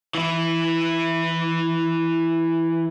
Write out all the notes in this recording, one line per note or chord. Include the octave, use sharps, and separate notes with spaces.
E3 E4